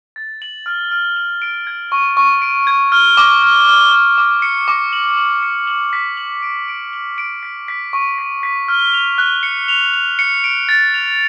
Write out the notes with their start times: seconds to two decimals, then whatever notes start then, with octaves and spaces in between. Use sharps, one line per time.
0.16 A6
0.42 F#7
0.66 F6
0.91 F6
1.16 F#7
1.42 D7
1.67 G#6
1.92 C#6
2.17 C#6
2.42 D7
2.67 G#6
2.92 F6
3.17 D6
3.42 F6
3.67 F6
3.92 F6
4.18 D6
4.42 C#7
4.68 D6
4.93 F#7
5.17 F#7
5.43 C#7
5.67 F#7
5.93 B6
6.17 F#7
6.43 D7
6.68 D7
6.93 F#7
7.18 D7
7.43 B6
7.68 B6
7.93 C#6
8.18 B6
8.43 B6
8.68 F6
8.93 F7
9.18 F#6
9.43 C#7
9.68 F7
9.94 F7
10.19 C#7
10.44 D7
10.69 A6
10.94 F7